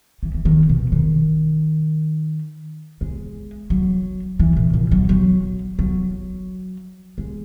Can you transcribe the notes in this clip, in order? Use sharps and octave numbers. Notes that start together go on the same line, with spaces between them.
E3
E3
D#3
B2
D#3
G#3
F#3
E3
A#2
A#2
F#3
F#3
F#3
G#3